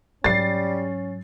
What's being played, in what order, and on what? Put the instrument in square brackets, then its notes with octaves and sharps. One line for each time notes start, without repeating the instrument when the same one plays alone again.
[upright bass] G#2 F#3 [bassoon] G3 [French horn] C#4 [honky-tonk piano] A6 C7